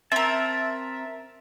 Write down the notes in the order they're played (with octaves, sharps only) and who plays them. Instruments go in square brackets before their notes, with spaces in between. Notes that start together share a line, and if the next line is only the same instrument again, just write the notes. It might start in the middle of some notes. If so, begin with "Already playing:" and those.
[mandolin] C4 A#4 [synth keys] E5 [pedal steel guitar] A5